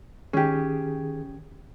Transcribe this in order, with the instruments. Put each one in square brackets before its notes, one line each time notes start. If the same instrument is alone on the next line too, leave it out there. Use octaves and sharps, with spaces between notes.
[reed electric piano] D#3 G#4 [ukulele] C#4 G4